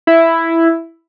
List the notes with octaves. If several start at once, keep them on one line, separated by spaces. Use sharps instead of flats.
E4